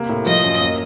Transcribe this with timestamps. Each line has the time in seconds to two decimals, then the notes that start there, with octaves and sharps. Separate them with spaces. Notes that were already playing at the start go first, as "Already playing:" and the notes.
Already playing: C3 A#3
0.09 A2
0.26 F3 D#5
0.44 F#2
0.61 A#3